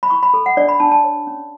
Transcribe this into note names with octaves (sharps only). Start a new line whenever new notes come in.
B5
E4 C#6
B5
A4
F#5
D4 D5
B5
D4 A5
A5
C#5
C#4